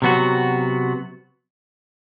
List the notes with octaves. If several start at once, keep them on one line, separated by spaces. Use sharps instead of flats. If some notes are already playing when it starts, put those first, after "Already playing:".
C3 F#3 B3 F#4